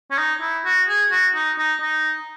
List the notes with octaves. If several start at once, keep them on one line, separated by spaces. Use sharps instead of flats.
C#4
D#4
E4
F#4
G#4
F#4
D#4
D#4
D#4